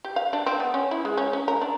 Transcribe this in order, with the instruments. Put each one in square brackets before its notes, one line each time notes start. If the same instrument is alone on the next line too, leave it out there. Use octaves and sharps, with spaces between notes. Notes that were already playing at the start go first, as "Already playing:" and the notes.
[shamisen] G4
F5
D4
C4
B3
C#4
E4
G#3
C#4
C#4
A#4
D4